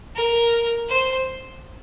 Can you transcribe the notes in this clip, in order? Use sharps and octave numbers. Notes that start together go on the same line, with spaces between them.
A#4
C5